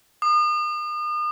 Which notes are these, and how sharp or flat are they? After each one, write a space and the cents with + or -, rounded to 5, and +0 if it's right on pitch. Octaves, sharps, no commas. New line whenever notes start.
D#6 -40